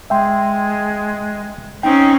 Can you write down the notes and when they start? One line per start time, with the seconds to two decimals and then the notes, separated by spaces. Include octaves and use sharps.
0.10 G#3 E5 G5 C6
1.83 C4 C#4 D#4 G5